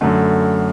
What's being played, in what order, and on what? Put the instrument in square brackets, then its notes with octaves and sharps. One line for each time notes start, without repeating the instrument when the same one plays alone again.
[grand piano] F#2 D3 A3